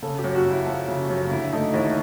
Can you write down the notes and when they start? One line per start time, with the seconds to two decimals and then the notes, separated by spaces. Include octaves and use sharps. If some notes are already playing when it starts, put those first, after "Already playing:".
0.02 C#3 A4
0.19 G4
0.24 F#2
0.35 F#4
0.45 F#2
0.51 E4
0.67 F3
0.88 C#3
1.10 F#2
1.31 D3 E4
1.53 A3 D#4
1.74 D#2 E4